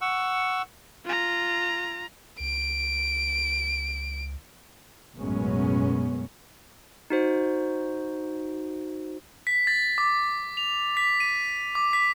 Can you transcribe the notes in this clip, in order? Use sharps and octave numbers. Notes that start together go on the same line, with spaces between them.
F#5 C#6 E6
F4 A#5
C#2 D7
A1 F#2 B2 G#3 B3 C#4
D#4 F#4 C5
B6
A6
D6
F7
B6
D#7
D6
B6